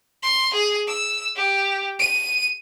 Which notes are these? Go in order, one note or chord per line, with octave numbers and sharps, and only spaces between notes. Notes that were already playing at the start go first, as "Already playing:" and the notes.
C6
G#4
E6
G4
D#7